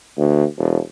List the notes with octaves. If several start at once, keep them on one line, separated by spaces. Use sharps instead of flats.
D2
E1